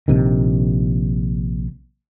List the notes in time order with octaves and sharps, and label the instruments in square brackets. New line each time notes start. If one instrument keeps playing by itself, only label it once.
[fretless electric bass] A#1 C3 D#3